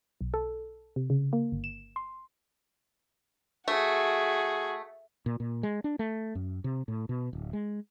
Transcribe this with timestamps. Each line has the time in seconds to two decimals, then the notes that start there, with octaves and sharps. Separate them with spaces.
0.21 B1
0.34 A4
0.96 C3
1.10 C#3
1.33 A#3
1.52 G1
1.64 E7
1.96 C6
3.68 A3 F#4 G#4
5.26 A#2
5.40 A#2
5.63 G#3
5.84 D4
5.99 A3
6.35 F#2
6.64 C3
6.88 A2
7.09 B2
7.33 D1
7.53 G#3